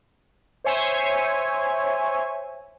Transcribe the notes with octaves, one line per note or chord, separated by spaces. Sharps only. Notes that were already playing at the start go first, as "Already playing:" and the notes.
C5 C#5 E5 G#5